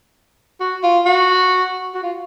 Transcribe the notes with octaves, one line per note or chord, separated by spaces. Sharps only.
F#4
F4
F#4
F#4
F4